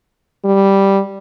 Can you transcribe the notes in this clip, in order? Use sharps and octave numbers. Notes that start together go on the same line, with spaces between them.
G3